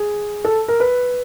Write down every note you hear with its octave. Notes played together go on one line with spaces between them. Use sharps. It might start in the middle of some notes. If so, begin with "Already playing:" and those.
Already playing: G#4
A4
A#4
B4